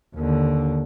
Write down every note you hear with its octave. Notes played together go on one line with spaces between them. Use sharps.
D#2 D3